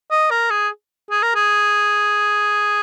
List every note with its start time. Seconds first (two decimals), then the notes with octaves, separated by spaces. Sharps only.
0.11 D#5
0.30 A#4
0.51 G#4
1.11 G#4
1.23 A#4
1.35 G#4